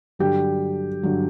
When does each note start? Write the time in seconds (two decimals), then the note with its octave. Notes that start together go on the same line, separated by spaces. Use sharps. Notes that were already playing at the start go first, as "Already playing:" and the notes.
0.19 G2 D3 F#3 G4 G5
1.03 G2 D3 F#3